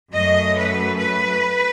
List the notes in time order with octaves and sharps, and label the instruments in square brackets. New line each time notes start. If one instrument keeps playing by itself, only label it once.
[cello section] F#2 F#3 A3 D#5
B4
B4